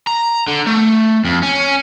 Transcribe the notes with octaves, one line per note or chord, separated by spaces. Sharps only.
A#5
D3
A3
F2
C#4